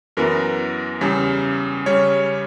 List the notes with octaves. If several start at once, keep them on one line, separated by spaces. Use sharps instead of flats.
F#2 E3 B3 A#4
E2 C#3 G3
C#3 G3 C#4 C#5